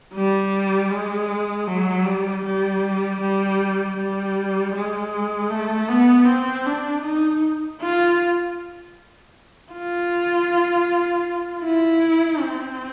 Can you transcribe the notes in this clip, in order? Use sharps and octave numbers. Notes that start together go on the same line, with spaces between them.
G3
G#3
F#3
G3
G3
G3
G3
G#3
A3
B3
C4
D4
D#4
F4
F4
E4
C4